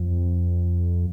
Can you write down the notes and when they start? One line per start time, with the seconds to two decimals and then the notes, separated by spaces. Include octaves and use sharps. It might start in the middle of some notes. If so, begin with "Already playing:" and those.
Already playing: F2